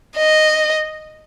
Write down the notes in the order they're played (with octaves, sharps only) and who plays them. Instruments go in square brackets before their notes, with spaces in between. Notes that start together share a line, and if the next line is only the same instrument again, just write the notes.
[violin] D#5